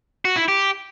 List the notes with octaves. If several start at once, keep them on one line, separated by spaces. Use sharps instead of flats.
F#4
E4
G4